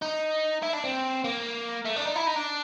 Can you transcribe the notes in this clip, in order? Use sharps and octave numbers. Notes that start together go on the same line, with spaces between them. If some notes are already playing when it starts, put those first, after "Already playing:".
D#4
E4
D4
C4
A#3
A3
D4
D#4
E4
D#4
D4